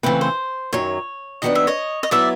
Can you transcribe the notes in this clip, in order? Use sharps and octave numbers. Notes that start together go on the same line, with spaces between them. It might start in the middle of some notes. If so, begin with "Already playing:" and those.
C#3 E3 A3 C4 B4
C5
F#2 D#3 F#3 C#5
D#3 F#3 B3 D4 F#4 D#5
E5
C#5 D#5
D#5
F#3 B3 E4 D5 E5